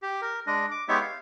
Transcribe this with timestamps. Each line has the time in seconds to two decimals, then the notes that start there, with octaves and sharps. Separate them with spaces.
0.02 G4
0.22 A#4
0.47 G#3 D4 D#5
0.71 D6
0.88 G#3 B3 D#4 G4 C#5 E5
1.01 F5